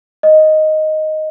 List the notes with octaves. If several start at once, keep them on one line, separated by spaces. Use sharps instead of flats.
D#5